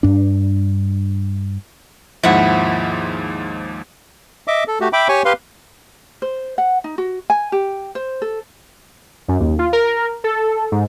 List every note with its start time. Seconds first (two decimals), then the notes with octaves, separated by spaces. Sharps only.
0.03 G2 D4
2.23 D#2 G#2 F3 E4 F#5
4.48 D#5 E5 D6
4.67 A4
4.81 A3 F#4 G4
4.93 E5 G5 B5 D6
5.09 G4 C#5 G#5 C#6
5.25 G4 B4 F5 C6
6.22 C5
6.58 F#5
6.84 D#4
6.98 F#4
7.30 G#5
7.52 G4
7.95 C5
8.22 A4
9.28 F#2
9.40 D#2
9.59 F4
9.73 A#4
10.24 A4
10.72 G#2